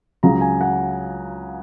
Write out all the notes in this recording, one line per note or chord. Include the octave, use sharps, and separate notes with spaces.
C#2 C#3 F#3 A#5
G#5
F#5